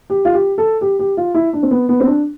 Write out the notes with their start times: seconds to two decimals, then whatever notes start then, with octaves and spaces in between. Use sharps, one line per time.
0.10 G4
0.25 F4
0.34 G4
0.58 A4
0.81 G4
0.99 G4
1.17 F4
1.34 E4
1.53 D4
1.63 C4
1.71 B3
1.89 B3
2.00 C4
2.07 D4